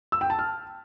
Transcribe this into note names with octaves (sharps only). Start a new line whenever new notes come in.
E6
G5
A5
F6